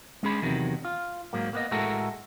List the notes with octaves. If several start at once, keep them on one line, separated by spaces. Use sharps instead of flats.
G#3 C#4 G#4 B5
E2 C3 D#3 F#3
F4
G#2 F#3 A#3
A#3 B3 D#5
A2 G#3 A3 F#4 A4 A#4